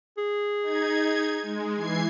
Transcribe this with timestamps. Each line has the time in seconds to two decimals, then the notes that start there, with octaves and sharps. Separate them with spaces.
0.18 G#4
0.63 D#4 G#6
1.43 G#3
1.77 E3 G#6 C7